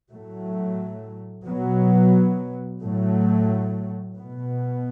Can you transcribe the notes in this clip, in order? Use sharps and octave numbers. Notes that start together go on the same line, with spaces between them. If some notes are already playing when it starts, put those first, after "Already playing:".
A2 F#3 A3
B2 F#3 B3
A2 F#3 A3
B2 B3